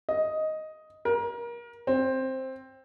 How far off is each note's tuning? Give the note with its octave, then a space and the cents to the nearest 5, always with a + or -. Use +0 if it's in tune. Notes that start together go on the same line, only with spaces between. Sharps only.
D#5 +5
A#4 +30
C4 +10